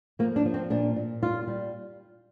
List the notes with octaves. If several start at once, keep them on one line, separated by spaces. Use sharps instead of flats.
F3 A#3
D4
F3
C4
A#2 D4
A#2
G3 F4
G3